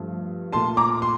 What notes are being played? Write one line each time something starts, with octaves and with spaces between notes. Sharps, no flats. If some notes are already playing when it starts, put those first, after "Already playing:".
Already playing: G2 F3 A3
A#2 A3 A5 C6
A#5 D6
C6